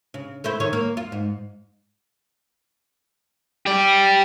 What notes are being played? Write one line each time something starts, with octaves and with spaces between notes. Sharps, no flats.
C#3
A3 E4 C5
D#3 C#5
A#3
F4
G#2
G4 D5